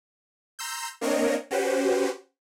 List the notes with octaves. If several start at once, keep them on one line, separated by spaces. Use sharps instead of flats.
A#5 C6 E6 G6
A#3 C4 D4 A#4 C#5 D#5
C#4 F#4 G4 B4 C5